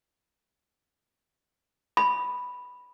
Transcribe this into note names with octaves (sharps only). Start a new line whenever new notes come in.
B5